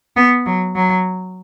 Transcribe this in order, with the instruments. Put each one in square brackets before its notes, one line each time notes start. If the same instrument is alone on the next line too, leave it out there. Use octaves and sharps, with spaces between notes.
[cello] B3
F#3
F#3